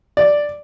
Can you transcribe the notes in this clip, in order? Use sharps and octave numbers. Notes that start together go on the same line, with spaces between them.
D5